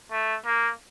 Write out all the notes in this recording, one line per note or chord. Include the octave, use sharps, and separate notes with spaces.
A3
A#3